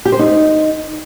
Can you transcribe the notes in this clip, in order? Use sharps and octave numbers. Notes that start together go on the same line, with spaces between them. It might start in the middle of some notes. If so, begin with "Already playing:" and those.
G4
C5
D#4